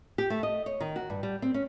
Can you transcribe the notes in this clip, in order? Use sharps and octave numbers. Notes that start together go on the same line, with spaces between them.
G4
A3
D#5
C#5
D#3
F#4
G2
G3
C4
C#4